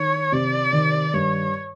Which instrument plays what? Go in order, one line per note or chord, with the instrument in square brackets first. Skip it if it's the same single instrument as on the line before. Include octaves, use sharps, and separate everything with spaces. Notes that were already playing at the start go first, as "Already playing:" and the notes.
Already playing: [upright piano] D#3 [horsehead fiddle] C#5
[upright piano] C3 [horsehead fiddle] D5
[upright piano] D#3
[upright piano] G2 [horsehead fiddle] C#5